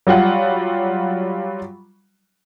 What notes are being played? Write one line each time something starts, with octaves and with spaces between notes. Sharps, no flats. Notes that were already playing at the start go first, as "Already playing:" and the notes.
F#3 G3 F4 F#5